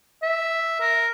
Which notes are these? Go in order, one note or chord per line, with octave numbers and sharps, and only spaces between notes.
E5
A#4